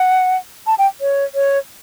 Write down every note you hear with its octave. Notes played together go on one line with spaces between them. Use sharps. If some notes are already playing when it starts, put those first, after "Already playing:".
Already playing: F#5
A5
G5
C#5
C#5